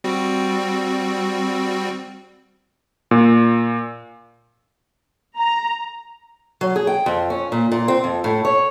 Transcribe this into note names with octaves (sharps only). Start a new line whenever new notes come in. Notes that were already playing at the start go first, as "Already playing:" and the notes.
G3 C4 F#4
A#2
A#5
F#3
G#4
G5
F2
C#4
A#2
A#2
C4
F2
A2
C#5